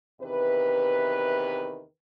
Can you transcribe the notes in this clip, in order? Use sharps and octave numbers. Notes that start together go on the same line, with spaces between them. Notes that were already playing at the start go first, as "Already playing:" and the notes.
E2 C3 D#3 B4